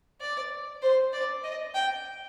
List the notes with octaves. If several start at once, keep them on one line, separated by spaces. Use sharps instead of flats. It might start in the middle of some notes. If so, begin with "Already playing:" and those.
D5
C5
D5
D#5
G5